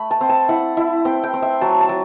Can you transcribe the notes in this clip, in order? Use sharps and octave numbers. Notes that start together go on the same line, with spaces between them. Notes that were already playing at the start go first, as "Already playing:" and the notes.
Already playing: A3 B5
A5
C4
A5
E4 F#5
E4
C4 G5
G5
C4
E5
F#3 A5
A5
F#3